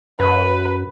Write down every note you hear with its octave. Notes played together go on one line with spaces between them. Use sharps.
F#2 B4